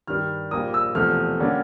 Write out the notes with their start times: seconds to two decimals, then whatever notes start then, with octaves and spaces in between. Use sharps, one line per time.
0.07 G2 D#3 G3 F6
0.51 A#1 A#2 G3 A#3 D#6
0.74 E6
0.95 E1 E2 C3 F3 A3 F6
1.40 D3 G3 A#3 C#4